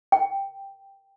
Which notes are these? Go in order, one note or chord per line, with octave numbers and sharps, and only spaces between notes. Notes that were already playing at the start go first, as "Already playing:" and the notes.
G5